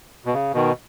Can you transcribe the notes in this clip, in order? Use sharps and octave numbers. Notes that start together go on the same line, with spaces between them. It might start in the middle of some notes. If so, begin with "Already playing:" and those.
B2
C#3
B2 D#3